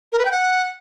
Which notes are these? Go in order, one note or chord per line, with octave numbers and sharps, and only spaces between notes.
A#4
B4
G5
F#5